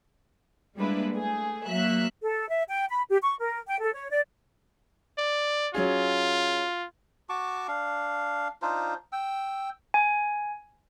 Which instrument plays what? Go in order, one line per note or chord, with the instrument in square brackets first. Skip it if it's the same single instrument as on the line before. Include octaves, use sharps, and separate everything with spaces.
[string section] G3 G#3 A#3 D4 E4 B4
A3 G#4
F#3 A#3 E5 F#6
[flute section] A4
E5
G5
B5
G4
C#6
A#4
G5
A4
C#5
D5
[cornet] D5
[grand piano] F#3 C#4 G#4 [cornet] F4
[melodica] F#4 A5 C#6 D6
D4 F5
D4 D#4 F4 C5
G5 E6
[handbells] G#5